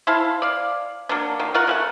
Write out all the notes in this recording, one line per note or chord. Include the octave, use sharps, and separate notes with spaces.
E4 C5 F5 A5
D5 F5
F#3 A#3 D4
D#3 A#3
F4 F#4 A#4 F#5
C#3 A3 F#5